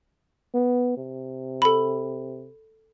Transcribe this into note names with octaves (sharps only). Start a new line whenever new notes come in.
B3
C3
A4 B5